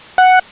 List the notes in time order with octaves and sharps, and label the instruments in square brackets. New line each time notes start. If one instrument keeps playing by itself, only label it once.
[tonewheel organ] F#5